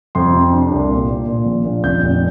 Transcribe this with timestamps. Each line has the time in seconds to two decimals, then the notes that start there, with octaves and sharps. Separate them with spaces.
0.15 F2 C6
0.34 C3
0.53 D4
0.72 C2
0.91 A#2
1.09 A#2
1.28 A#2
1.46 A#1
1.65 A#2
1.84 F1 G6
2.03 F1